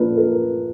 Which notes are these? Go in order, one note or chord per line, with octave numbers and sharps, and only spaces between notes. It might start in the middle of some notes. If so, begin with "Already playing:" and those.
Already playing: A#2 F3 A#3 D4 A#4 B4
A#4